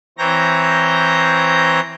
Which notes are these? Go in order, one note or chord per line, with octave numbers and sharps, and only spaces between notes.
E3 C4 C#5 A#5 G6 A#6